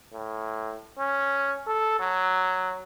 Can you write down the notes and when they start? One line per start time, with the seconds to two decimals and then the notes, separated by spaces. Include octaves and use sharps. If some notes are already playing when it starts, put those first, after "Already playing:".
0.13 A2
0.98 C#4
1.67 A4
2.00 F#3